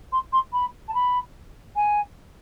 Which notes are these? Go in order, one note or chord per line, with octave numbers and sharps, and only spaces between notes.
C6
C6
B5
A5
B5
G#5